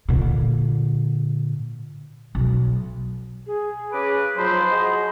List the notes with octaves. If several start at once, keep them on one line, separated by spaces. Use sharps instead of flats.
A#2 D3
B1
G#4
C#3 B4 D6
G#2 F3 F#3 C5 B5
F#4 G#4 D#5